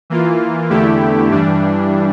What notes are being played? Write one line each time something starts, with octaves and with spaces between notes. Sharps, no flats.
E3 A#3 F4
E2 D3 A3 E4 G4
G2 E3 G3 D4